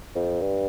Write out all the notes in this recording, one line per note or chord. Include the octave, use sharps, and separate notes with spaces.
F2
G2